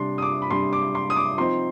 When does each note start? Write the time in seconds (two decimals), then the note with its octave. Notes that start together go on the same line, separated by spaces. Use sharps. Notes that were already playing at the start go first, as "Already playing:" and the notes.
Already playing: C3 G3 D4 C6
0.18 D#6
0.22 D6
0.42 B5
0.50 C3 G3 D4 C6
0.73 D6
0.95 C6
1.10 D#6
1.16 D6
1.37 F3 C4 D#4 C6